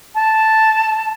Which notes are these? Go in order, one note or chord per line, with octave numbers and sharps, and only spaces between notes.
A5